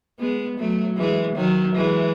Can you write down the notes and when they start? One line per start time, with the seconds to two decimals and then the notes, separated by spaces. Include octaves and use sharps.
0.19 G#3 B3
0.58 F#3 A3
0.97 E3 G#3
1.36 D#3 F#3
1.76 E3 G#3